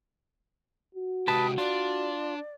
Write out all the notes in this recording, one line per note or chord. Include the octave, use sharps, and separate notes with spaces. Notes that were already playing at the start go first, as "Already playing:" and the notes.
F#4
C3 G#3 G4 B4 A5 D#6
D4 F4 D5